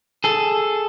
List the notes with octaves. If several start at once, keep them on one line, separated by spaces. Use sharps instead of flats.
G#4 A4